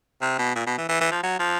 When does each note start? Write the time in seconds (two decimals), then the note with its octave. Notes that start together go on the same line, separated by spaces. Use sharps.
0.21 C3
0.38 B2
0.55 A#2
0.66 B2
0.77 E3
0.89 E3
1.00 E3
1.11 F3
1.23 F#3
1.39 F3